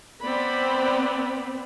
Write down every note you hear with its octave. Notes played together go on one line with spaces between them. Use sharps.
B3 C4 D5 B5